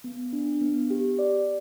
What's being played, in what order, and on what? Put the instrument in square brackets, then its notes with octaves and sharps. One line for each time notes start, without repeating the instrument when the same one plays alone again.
[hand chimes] B3
D4
B3
G4
D5